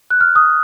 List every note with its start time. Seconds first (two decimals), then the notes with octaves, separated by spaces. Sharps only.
0.10 F#6
0.21 F6
0.36 D#6